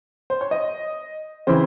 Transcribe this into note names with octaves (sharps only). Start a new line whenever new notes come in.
C5
C#5
D#5
C#3 E3 C4 E4 C5